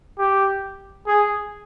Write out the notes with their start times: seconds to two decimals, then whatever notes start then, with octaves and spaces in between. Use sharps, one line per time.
0.19 G4
1.07 G#4